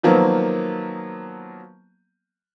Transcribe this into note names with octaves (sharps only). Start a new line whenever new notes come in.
D#3 F3 F#3 A#3 B3